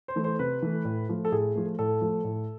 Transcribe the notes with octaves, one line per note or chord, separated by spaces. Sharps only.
C5
E3 A3
C5
C3 B4
E3 A3
A2
F3 A3
A4
A2 G#4
F3 A3
A2 A4
F3 A3
A2